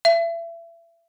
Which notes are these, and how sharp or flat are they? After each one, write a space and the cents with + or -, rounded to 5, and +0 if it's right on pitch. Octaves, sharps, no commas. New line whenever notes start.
E5 +30